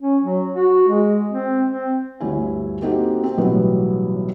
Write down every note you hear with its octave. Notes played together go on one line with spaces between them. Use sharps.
C#4
F#3
F#4
G#3
C4
C4
G1 D2 G2 E4 G#5
A#3 C4 D#4 F#4 G4 A4
C4
B1 A2 E3 F#3 G3 B3